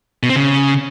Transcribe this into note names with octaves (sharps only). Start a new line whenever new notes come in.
B2
C4
C#3